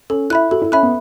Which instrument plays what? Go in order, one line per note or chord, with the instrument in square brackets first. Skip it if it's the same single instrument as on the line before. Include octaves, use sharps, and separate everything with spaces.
[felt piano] C#4 [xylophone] A4
[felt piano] E4 [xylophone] E5 B5 F#6
[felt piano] F#4 [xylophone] A4
[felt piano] E4
[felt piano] C#4 [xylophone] E5 B5 F#6
[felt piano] B3